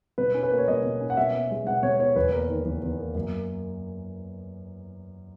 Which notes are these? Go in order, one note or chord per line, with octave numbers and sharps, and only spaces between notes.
B2 B4
C#4
B4
A#3
C#5
B2 D#5
B2
C#4
F#5
B2 E5
B3
G#3
B2 F#5
B2 C#5
B3 C#5
E2 B4
A#3 A#4
D#3
E2
E2
A#3
F#2